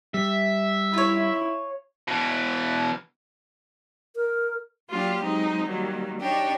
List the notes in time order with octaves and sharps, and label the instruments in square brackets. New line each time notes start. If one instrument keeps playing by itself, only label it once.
[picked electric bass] G3 [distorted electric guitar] E5
[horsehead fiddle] E4 [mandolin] F4 C#5
[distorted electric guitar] B2 E3
[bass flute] A#4
[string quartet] F#3 A#3 D4 F4 G4
F#3 G#3 C4 D#4
D#3 F#3 G3 A#3
D4 D#4 G4 C#5